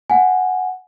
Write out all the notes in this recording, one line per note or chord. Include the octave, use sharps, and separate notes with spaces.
F#5 G#5